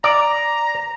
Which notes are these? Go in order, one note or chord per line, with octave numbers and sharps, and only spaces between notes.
D5 A#5